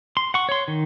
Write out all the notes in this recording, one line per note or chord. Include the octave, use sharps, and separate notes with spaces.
C6
F#5 C#6
C#5 C6
D#3